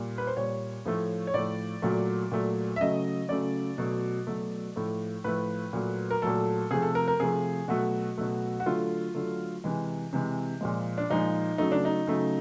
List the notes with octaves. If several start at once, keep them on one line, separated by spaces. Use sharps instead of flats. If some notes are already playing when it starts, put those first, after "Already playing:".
Already playing: A#2 G3
B4
C5
A#2 G3 C#5
A2 F3 A3
C#5
A2 F3 A3 D5
A#2 F#3 A3
A#2 F#3 A3
E5
C#3 F#3 A3 D#5
C#3 F#3 A3 D5
B2 F#3 A3
B2 F#3 A3
A2 F3 A3
A2 F3 A3 B4
A#2 F#3 A3
A#4
A#2 F#3 A3 A4
C3 F3 A3 G#4
A4
A#4
A#4
C3 F3 A3 G#4
B2 F#3 A3 F#4
B2 F#3 A3
F#4
D3 F#3 A3 F4
D3 F#3 A3
C3 E3 G#3
C3 E3 G#3
A#2 F3 G#3
D4
A#2 F3 G#3 D#4
C#3 F#3 A3 D#4
D4
D#4
C#3 F#3 A3